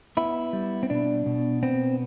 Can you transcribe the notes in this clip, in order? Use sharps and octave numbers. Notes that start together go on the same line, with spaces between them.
B3 E4
G3
C4
B2 D4
B2
B3 C4